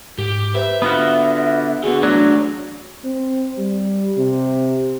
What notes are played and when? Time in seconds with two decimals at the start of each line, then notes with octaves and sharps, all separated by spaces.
0.18 G#2 G4
0.55 B4 C5 E5
0.82 D3 B3 F4 F#4 E5
1.84 D3 B3 F#4 G#4
2.03 E3 F#3 A3 D4 F#4 D5
3.04 C4
3.58 G3
4.18 C3